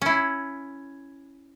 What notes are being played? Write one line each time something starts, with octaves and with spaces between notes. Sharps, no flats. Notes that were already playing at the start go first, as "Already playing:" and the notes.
C#4 E4